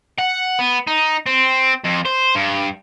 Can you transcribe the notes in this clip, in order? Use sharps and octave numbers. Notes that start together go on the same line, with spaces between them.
F#5
B3
D#4
C4
F2
C5
G2